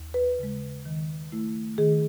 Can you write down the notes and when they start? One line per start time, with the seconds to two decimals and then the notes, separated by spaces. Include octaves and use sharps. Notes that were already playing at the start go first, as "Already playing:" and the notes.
Already playing: D#2
0.14 B4
0.39 C#3 G#3
0.86 D#3
1.32 A3 E4
1.78 D#3 G#4